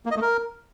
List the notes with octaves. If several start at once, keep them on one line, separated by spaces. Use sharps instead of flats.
A#3
D#5
A3
A#4